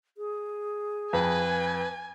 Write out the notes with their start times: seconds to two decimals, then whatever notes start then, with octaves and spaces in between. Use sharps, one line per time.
0.17 G#4
1.13 F2 B4 G#5